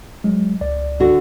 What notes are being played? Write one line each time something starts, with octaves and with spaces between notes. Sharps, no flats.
F#3 G#3
C#2 D5
D3 F#4